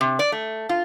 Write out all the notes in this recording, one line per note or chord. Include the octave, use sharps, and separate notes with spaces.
C3
D5
A3
F4